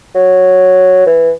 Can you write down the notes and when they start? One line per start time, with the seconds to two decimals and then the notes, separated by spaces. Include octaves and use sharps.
0.15 F#3
1.06 E3